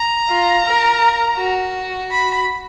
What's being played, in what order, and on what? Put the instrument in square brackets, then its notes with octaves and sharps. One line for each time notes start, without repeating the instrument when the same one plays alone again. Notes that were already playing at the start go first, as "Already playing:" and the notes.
Already playing: [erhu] A#5
[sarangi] F4
A#4
F#4
[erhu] B5